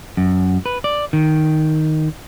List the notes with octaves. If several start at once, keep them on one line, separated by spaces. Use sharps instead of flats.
F#2
B4
D5
D#3